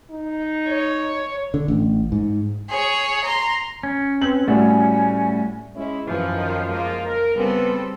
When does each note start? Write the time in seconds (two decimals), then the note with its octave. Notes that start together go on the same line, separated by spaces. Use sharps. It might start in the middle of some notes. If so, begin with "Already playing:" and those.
0.11 D#4
0.69 C#5
1.54 D3
1.68 A1
2.12 G#2
2.70 G#4 C#5
3.24 A#5 C6
3.83 C#4
4.22 C4 B4 F#7
4.48 A2 G3 A3 F#4 G#5
5.75 G#3 C#4 E4
6.06 F#2 E3 F3
6.35 D#3
6.69 G#3 A#3 F4
7.05 A#4
7.35 C#3 G3 B3 C4 A4